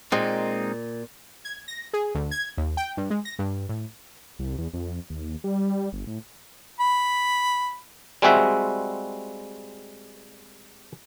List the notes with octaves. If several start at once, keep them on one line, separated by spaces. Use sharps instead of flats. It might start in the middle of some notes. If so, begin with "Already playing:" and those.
A#2 G#3 C4 D#4
G#6
A#6
G#4
D2
G#6
D#2
G5
G2
G#3
A#6
G2
A2
C2
E2
F2
D#2
G3
G1
A2
B5
G3 G#3 C4 F#4 E5